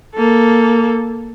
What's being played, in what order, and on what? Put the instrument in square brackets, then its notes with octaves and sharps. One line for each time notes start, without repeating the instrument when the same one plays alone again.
[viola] A#3 A4